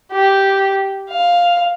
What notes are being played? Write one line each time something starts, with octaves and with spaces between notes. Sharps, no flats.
G4
F5